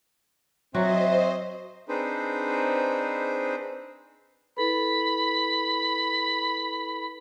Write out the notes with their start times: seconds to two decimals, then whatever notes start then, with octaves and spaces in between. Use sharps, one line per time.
0.74 F#3 C4 F#4 C5 D#5 E5
1.88 C4 D4 D#4 G#4 B4 C5
4.57 E4 A4 B4 B5